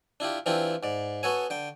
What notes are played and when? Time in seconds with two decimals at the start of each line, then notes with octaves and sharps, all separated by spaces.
0.20 D4 E4 F4 G4
0.46 E3 C4 D4 E4 F4 G4
0.83 G#2 D5
1.23 B3 F#4 A4 C#5 G#5
1.50 D3 G5